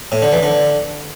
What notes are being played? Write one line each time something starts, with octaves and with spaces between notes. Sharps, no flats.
A2
D3
E3
D3